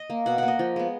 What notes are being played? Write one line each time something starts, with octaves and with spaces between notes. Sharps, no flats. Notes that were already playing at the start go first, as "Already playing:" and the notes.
Already playing: D#5
A#3
B2 F#5
A#3 F#5
D#5
F3
G#3 B3